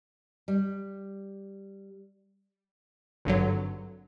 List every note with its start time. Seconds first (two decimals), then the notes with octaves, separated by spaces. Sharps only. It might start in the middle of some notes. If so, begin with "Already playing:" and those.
0.48 G3
3.25 G#1 G2 D3 F#3